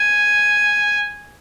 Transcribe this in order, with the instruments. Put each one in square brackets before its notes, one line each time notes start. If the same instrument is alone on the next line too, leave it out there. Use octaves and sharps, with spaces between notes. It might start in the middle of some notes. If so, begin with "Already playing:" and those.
Already playing: [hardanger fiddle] G#5